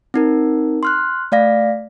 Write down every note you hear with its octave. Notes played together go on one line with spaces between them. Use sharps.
C4 D#4 A#4
C6 F6 F#6
A3 D5 F5 A#6